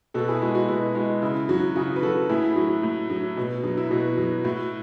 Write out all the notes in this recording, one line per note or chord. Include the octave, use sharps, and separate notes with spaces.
B2 F#4 A4
E4 G#4
G#3 F#4
F#4
B2 E4
G#3 F#4
C#3 E4
F#3 F#4
C#3 F#4
B4
F#3 F#4 A4
A2 E4 G#4
F#3 F#4
A2
F#3
B2
F#3
E4
B2 F#4
F#3
A2 F#4